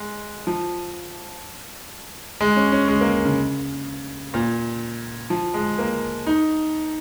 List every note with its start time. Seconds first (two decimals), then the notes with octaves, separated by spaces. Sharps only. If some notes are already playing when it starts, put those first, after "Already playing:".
Already playing: G#3
0.47 F3
2.41 G#3
2.56 C#4
2.72 C#4
2.88 G#3
3.01 A#3
3.25 C#3
4.34 A#2
5.30 F3
5.54 G#3
5.79 A#3
6.27 D#4